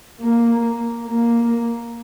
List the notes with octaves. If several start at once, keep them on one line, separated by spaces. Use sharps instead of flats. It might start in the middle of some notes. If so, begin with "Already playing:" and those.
A#3
A#3